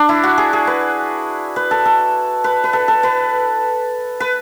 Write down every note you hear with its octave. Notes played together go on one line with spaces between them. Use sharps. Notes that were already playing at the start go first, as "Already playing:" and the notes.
Already playing: D4
E4
F#4
G#4
G#4
B4
B4
A4
A4
B4
B4
A4
A4
B4
B4